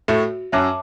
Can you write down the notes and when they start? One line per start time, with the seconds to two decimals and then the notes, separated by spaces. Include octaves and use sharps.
0.08 A2 A3 F#4
0.52 F#2 F#3 C#5 E5 A5 D6